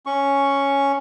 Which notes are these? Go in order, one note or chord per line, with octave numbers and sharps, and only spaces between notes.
C#4 C#6